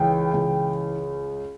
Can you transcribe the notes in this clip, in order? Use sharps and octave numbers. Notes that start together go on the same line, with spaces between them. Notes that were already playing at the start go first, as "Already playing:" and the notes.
Already playing: C#2 E3 G5
C#2